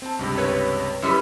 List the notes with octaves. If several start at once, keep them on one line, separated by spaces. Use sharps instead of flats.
C4 A5
C#2 G2 C3
B4 C#5
F#2 G3 E4 B4 B5